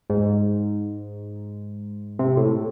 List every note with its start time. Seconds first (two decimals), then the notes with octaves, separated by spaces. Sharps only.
0.10 G#2
2.19 C3
2.37 A2